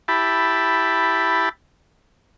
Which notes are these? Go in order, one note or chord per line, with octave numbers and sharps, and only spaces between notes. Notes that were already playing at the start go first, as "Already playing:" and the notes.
E4 G4 A5 B5